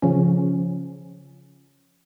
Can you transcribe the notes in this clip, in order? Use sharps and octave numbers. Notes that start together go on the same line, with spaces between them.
C#3 F3 C#4